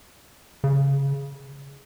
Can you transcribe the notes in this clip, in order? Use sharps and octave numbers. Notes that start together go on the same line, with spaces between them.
C#3